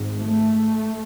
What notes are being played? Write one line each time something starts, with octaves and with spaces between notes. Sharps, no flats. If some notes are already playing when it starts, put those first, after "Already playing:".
Already playing: G#1 G#2
A3